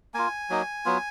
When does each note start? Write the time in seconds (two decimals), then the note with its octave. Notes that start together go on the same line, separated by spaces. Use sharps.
0.14 A#3 F4 G#5
0.50 F#3 A#3 D#4
0.86 F#3 B3 F4